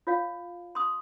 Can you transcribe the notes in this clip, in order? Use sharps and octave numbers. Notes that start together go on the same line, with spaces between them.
F4 C#5 F5
C6 D#6